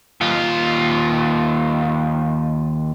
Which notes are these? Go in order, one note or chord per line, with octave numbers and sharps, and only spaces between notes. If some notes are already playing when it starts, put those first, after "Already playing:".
D#2 F4